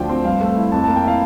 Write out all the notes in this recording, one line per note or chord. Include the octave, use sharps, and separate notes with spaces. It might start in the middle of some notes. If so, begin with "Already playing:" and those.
Already playing: D2 F3 D4 G5
C4
G2 F5
A3
E4
F2 A5
A#3 A5
G5
E4 F5